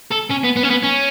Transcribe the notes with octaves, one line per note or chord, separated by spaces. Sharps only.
A4
C#4
B3
B3
C#4
B3
C#4